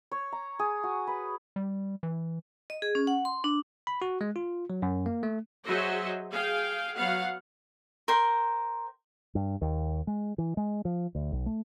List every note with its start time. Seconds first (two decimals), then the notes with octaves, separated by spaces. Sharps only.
0.12 C#5
0.32 A#5
0.59 G#4
0.83 F#4
1.07 B4
1.56 G3
2.03 E3
2.70 D#5
2.82 G#4
2.95 C#4
3.07 F#5
3.25 C6
3.44 D4
3.87 B5
4.02 F#4
4.21 G#3
4.36 F4
4.70 F#3
4.82 F#2
5.06 A#3
5.23 A3
5.66 F#3 F#4 G#4 C5 D#5 E5
6.32 G#4 F5 G5
6.96 F#3 B3 F5 F#5
8.08 A#4 C5 G5 C6
9.35 G2
9.62 D#2
10.07 G#3
10.38 E3
10.57 G#3
10.85 F3
11.15 D2
11.32 B1
11.46 A3